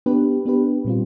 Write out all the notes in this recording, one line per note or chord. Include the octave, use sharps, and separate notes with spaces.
B3 D4 G4 B4
B3 D4 G4 B4
A#2 G3 C4 F4